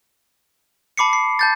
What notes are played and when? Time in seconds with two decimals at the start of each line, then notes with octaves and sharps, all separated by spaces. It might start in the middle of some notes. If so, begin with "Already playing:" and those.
0.97 A5 B5 D6 C7 C#7
1.13 C7
1.39 A5 G6 A6